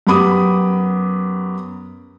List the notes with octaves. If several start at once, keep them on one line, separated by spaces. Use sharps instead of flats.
F#2 B3 G4 B5 D6 D#6